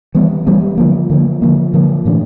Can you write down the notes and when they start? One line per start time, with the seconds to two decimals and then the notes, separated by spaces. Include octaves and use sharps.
0.15 E3 G3 B3
0.47 E3 G3 B3
0.78 D3 F3 A#3
1.10 D3 F3 A#3
1.42 D3 F3 A#3
1.74 D3 F3 A#3
2.05 A2 E3 A3 D4